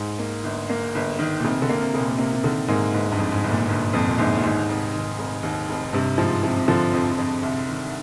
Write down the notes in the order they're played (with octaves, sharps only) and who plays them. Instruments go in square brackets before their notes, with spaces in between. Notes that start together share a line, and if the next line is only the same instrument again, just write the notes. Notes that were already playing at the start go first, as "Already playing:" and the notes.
Already playing: [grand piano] G#2
[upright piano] A#3
G1
A#3
G1
D#3
[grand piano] A#2
[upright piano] F1 [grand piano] C3
[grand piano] D3
[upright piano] A#3
[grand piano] C3
[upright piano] F1
[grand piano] A#2
[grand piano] C3 [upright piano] A#3
[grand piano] C3
[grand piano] D3 [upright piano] D#3
[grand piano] G#2 [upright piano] A#3
[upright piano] G1 [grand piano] G#2
[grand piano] G2
[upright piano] F2
[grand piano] G#2
[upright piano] G1
[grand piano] A#2
[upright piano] G1 [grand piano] A#2
[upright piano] F2 [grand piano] A#2
[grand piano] A#2
[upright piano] G1 [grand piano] G#2
[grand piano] A#2
[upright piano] D#2 [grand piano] G#2
[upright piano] F1
D#3
F1
D#2
F1
[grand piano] G2 [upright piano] C3
[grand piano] G#2 [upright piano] F3
[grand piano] C3 [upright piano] F3
[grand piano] C3
[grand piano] D3 [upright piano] F3
[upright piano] F2
F2
C2
D#3